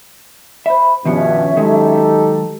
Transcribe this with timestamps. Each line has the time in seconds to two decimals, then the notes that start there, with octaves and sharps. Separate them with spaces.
0.66 C5 E5 B5
1.05 G2 B2 D#3 F3 B3 C#4 E5
1.57 D#3 F#3 G#3 D#4 G4 A4